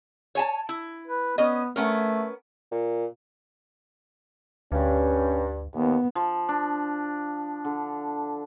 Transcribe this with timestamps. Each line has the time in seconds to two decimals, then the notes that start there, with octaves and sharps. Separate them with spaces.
0.35 C#5 G#5 A5
0.69 E4
1.08 B4
1.38 B3 C#4 D#5
1.76 A3 B3 C#4 A#4
2.71 A#2
4.72 D2 G2 C#4
5.75 D#2 B3
6.15 F3
6.49 D4
7.64 D3